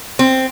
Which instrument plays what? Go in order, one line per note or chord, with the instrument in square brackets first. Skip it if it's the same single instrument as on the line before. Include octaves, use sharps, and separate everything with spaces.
[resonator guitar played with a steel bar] C4